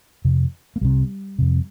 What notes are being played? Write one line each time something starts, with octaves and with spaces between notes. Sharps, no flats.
F2 C3
A#3
C2 C3 G3
F2 C3